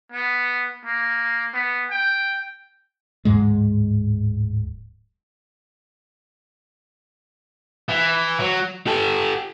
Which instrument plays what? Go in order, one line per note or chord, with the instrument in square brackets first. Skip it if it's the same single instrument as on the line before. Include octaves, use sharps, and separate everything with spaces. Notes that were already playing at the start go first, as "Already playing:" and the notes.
[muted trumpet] B3
A#3
B3
G5
[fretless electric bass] D1 B1 G#2 G#3
[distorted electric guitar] E3
F#3
[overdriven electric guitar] G4 A4